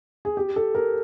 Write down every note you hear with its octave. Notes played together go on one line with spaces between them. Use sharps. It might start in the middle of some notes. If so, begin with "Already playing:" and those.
G#4
G4
A4
A#4